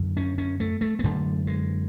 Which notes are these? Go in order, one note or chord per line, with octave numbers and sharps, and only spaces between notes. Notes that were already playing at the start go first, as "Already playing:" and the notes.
Already playing: F#2 D3
C#4
C#4
A3
A3
B3
F#2 D3 A3
G#3